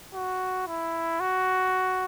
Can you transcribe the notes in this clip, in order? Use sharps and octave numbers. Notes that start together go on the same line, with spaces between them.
F#4
E4
F#4